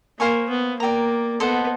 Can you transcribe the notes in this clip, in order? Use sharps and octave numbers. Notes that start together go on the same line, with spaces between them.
A#3 C5 F5 G#5 C#6
B3
A#3 D5 G5 A#5
B3 A4 C5 D#5 F#5